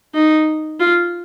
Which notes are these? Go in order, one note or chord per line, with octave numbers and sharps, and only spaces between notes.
D#4
F4